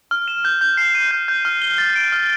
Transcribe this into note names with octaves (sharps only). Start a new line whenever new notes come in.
F6
E7
G6
G6
C7
D#7
G6
G6
F6
G7
A6
D7
F6